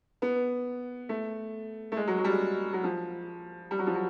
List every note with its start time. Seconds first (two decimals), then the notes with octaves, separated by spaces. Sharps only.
0.22 B3
1.09 A3
1.92 A3
1.97 G#3
2.07 F#3
2.18 F#3
2.24 G3
2.29 G#3
2.73 F#3
2.84 F3
3.71 G3
3.79 F#3
3.87 F3
3.95 F#3